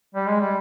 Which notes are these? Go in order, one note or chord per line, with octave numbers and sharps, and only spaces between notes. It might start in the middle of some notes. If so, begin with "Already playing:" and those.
G3
G#3
G3